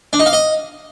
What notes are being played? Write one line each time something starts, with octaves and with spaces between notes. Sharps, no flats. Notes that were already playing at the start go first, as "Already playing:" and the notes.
D4
D#4
F5
D#5